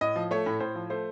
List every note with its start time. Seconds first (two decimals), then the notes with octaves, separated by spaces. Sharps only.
0.01 A2 D#5
0.16 F3
0.31 A3 C#5
0.46 A2
0.60 A2 C5
0.75 F3
0.90 A3 C5